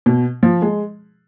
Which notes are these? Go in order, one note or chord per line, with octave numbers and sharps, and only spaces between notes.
B2
F3
G#3